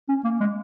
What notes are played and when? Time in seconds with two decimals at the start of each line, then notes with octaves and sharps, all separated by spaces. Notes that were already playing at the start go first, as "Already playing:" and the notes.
0.09 C#4
0.24 A#3
0.40 G#3